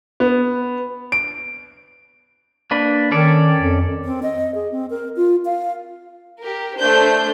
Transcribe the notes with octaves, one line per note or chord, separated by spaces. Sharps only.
B3
D7
A#3 D4 B4
D#3 C#4 A4 D5
F2
C4
D#5
G#4
C4
A#4
F4
F5
G4 A#4
A3 D4 C5 G6